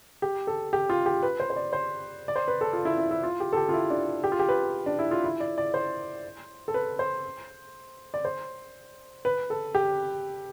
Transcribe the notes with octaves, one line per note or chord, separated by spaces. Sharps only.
G4
A4
G4
F4
G4
B4
C5
C5
D5
C5
D5
C5
B4
A4
F4
E4
E4
E4
F4
G4
A4
G4
F4
E4
D4
G4
F4
G4
B4
D4
E4
F4
E4
D5
D5
C5
A4
B4
C5
D5
C5
B4
A4
G4